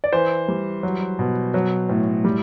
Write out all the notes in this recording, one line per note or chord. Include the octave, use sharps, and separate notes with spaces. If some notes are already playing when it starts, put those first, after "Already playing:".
D5
E3 C5
G3
F#3
B2
F#3
A2
G3